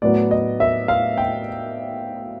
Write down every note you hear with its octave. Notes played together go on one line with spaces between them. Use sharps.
A2 F#3 B3 D5
D#5
E5
F5
G5